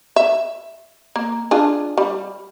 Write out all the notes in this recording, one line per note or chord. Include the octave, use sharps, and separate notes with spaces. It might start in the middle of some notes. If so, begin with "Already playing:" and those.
E5
A#3
D4 F4 G#4
G3